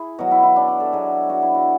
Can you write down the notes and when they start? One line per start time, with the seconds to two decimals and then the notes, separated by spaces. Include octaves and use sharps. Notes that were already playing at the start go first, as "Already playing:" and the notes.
Already playing: E4 G#4
0.19 B2 F#3 F#4
0.31 E4
0.43 E4
0.56 D4
0.68 D4
0.80 A4
0.93 B2 F#3 G#4
1.30 F#4
1.42 E4
1.55 F#4